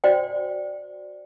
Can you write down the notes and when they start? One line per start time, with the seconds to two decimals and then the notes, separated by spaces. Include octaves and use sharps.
0.04 F#4 C5 D5 G5